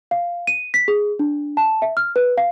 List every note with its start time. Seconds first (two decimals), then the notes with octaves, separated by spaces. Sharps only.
0.11 F5
0.47 D#7
0.74 B6
0.88 G#4
1.19 D4
1.57 A5
1.82 E5
1.97 F6
2.16 B4
2.38 F5